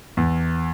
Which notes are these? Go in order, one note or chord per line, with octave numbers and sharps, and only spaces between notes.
E2